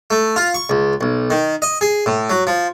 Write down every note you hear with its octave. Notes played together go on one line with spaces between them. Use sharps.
A3
F4
C#6
C#2
B1
D#3
D#5
G#4
A2
F#3
F3